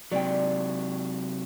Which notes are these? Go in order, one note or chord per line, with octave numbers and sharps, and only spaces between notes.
C3 F#3 D5 G5